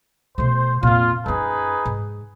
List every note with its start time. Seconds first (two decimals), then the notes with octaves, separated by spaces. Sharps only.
0.38 B2 A3 C5
0.83 F2 A#2 F4
1.26 F#2 C#4 D#4 G#4 B4
1.85 G#2